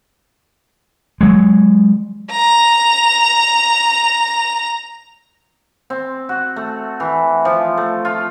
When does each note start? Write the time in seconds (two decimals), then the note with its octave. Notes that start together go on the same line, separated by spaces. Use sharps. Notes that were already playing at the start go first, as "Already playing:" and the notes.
1.21 F#3 G#3
2.32 A#5 F7
5.90 C4
6.29 F#4
6.56 A3
7.00 E3
7.45 F3
7.77 A3
8.05 F4